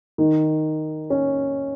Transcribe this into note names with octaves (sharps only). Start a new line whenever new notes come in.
D#3
C#4